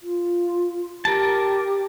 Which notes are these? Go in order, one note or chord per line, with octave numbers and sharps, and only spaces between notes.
F4
G4 A#4 A5